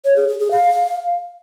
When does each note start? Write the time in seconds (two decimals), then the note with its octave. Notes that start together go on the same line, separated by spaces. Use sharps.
0.04 C#5
0.16 G#4
0.28 G#4
0.39 G#4
0.51 F5